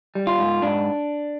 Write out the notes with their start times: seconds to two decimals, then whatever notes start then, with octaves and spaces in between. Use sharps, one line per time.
0.15 G3
0.27 F4
0.39 G#2
0.62 G#2 D4